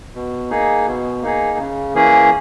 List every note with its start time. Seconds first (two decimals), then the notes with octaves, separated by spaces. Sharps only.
0.15 B2
0.50 A#3 D#4 G#4
0.87 B2
1.22 A#3 D#4 G#4
1.58 C#3
1.94 E3 A#3 C#4 G#4